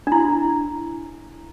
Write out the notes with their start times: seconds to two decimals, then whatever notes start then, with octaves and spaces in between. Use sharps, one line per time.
0.07 D4
0.12 E4